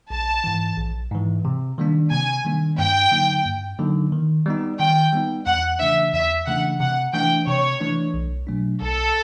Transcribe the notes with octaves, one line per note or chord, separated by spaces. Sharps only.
A#1 A5
G#2 E3
A#1
G#2 E3
C3
D#3 G3 A#3 D4
C3 G#5
D#3 G3 A#3 D4
G2 G5
D3 F#3 A#3 D#4
G2
D3 F#3 A#3 D#4
D#3
G3 B3 D#4
D#3 G5
G3 B3 D#4
E2 F#5
C#3 E3 A3 D4 E5
E2 E5
C#3 E3 A3 D4 F#5
C3 F#5
E3 A3 D4 G5
C3 C#5
E3 A3 D4
B1
B2 F#3 A3 D4
B1 A4